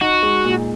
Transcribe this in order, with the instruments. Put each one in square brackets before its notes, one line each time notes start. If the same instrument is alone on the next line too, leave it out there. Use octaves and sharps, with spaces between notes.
[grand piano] D#4 [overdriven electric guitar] F#4
[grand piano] G#3
A#2